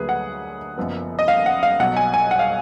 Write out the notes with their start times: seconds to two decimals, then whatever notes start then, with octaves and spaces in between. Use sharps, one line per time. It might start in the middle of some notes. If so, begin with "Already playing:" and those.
Already playing: D2 D3 F#3 A#3 D4 G#4 B4
0.09 F#5
0.77 F#1 F#2 F3 B3
1.19 D#5
1.28 F5
1.46 F#5
1.63 F5
1.79 B1 B2 F#3 F#5
1.97 G#5
2.14 G#5
2.31 F#5
2.39 F5